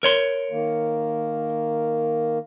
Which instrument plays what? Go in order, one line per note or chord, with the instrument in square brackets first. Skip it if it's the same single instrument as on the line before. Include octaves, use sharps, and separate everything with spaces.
[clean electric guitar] A#4 C#5 C6
[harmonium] D#3 A#3